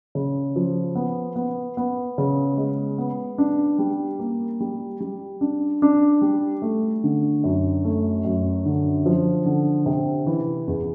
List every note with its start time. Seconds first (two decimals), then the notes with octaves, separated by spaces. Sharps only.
0.15 C#3
0.56 F3
0.95 B3
1.36 B3
1.77 B3
2.18 C#3
2.57 G#3
2.98 B3
3.38 D4
3.79 G3
4.19 A#3
4.60 G3
5.00 G3
5.41 D4
5.82 D4
6.21 G3
6.62 A3
7.04 D3
7.44 F#2
7.84 A3
8.25 F#2
8.66 D3
9.06 F3
9.46 D3
9.86 C3
10.26 E3
10.67 E2